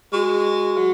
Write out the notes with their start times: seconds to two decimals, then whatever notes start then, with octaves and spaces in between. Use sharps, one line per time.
0.13 G#3 F#4
0.77 F#3